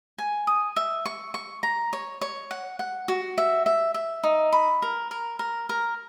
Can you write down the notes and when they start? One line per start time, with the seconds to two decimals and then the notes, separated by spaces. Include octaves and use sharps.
0.18 G#5
0.47 D#6
0.76 E5
1.05 C#6
1.34 C#6
1.63 A#5
1.93 C#5
2.21 C#5
2.51 F#5
2.79 F#5
3.08 F#4
3.38 E5
3.66 E5
3.94 E5
4.23 D#4
4.52 B5
4.82 A#4
5.11 A#4
5.39 A#4
5.69 A#4